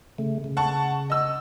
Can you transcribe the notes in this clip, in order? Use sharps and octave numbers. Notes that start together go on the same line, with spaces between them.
C#3 A3
C#3
F#5 A5 C#6
D#5 E6